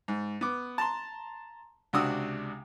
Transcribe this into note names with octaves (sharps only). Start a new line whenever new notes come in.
G#2
B3 D6
A5 A#5 C6
C#2 C3 D4 F#4 D#6 E6